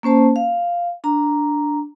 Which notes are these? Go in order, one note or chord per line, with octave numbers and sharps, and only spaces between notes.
A#3 C#4 C5 A5
F5
D4 A#5